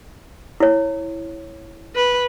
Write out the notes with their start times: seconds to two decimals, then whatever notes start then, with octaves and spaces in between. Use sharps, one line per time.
0.60 E4 C#5
1.96 B4